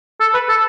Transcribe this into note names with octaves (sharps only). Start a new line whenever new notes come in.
A4
B4
A4